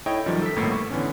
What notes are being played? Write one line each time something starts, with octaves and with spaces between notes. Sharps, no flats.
E4 A4 C#5 D#5 G5
F#2 D#3 F3 G3
A4 B6
G1 A2 A#3 B3 E4 C7
C#6
D3 E3 B3 C#4